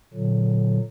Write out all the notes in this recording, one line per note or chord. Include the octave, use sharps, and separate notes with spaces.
A#2 D3 F#3